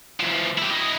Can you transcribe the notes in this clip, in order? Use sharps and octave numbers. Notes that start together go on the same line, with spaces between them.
E3 F3
E4 G4
E4 D#5